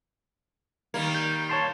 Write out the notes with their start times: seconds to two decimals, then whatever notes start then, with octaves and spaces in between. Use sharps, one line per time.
0.94 D#3 G3 A#3
1.15 G6
1.49 C#5 A5 C6